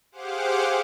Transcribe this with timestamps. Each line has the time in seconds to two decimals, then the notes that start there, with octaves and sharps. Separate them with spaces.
0.12 G4 G#4 C5 F5 F#5 D6